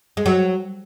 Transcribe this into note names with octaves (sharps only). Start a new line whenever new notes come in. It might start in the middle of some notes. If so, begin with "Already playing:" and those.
G#3
F#3